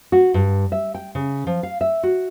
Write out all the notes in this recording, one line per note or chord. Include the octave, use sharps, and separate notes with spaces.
F#4
G2
E5
G5
C#3
F3
F5
E5
F#4